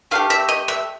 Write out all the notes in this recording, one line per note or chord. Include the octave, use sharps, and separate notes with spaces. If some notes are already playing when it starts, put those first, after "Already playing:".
A3 D4 G4 F5
E5
D#5
E5